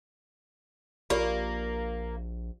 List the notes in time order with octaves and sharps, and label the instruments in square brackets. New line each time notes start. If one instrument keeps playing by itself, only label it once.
[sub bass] A#1 [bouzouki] A#3 [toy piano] F4 G4 D5